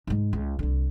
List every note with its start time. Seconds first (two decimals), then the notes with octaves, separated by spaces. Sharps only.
0.07 G#2 G#3
0.33 C#2
0.59 C2 D3